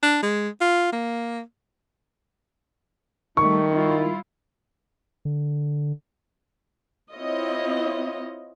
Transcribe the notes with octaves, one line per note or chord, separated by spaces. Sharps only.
D4
G#3
F4
A#3
D#3 G3 A3 C#6
G3 E4 F4
D3
C4 E4 F4 C#5 D#5